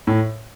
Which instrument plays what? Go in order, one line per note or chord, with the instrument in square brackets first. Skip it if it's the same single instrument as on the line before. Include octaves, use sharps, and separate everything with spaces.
[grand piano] A2